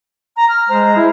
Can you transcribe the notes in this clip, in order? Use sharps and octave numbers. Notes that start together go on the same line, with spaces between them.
A#5
F6
G#3 C5 A#5
E4